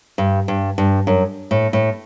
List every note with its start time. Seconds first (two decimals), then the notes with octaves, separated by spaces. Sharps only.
0.18 G2
0.48 G2
0.78 G2
1.07 F#2
1.51 A2
1.73 A2